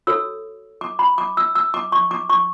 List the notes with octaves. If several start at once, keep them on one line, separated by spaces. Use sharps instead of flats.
F#4 A4 C#5 E6
D6
B5
D6
E6
E6
D6
C#6
D6
C#6